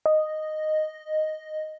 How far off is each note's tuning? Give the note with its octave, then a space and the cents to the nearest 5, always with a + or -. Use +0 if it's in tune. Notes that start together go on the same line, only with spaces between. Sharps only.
D#5 -5